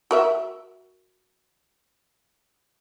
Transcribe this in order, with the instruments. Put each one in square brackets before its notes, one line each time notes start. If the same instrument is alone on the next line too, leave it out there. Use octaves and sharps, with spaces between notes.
[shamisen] F#4 A#4 E5